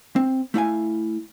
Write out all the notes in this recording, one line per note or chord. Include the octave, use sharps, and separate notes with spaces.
C4
A3 E4 F5 G#5